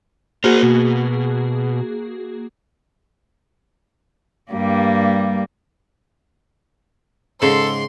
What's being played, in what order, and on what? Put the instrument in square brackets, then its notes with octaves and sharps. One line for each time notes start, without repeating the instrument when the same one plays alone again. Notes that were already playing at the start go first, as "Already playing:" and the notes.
[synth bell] A#3 F#4 G#4 [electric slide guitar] A#4 C5
[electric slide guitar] B2
[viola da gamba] G2 G3 A#3
[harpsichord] G#2 [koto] C#3 [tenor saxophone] A4 [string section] C6